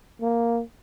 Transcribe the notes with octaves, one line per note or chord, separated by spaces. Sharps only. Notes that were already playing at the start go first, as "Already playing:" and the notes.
A#3